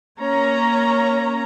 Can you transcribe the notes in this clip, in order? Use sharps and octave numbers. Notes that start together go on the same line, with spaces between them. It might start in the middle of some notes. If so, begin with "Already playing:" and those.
A#3 C#4 C#5 A#5